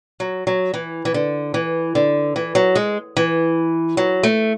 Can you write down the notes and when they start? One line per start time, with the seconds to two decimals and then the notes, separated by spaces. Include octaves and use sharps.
0.20 F#3
0.47 F#3
0.74 E3
1.05 E3
1.14 D3
1.54 E3
1.95 D3
2.36 E3
2.55 F#3
2.76 G#3
3.17 E3
3.97 F#3
4.23 A3